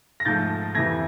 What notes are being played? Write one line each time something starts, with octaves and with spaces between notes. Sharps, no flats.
A#6
G#2 F3 A3 G6 A6
F2 C3 E3 G#6 A#6